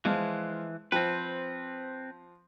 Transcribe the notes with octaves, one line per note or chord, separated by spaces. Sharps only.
E3 F3 G#3 F4
F3 C4 B4 G5